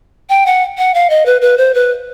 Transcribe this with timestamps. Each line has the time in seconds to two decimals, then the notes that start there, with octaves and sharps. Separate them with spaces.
0.29 G5
0.46 F#5
0.78 F#5
0.94 F5
1.10 D#5
1.26 B4
1.42 B4
1.58 C5
1.74 B4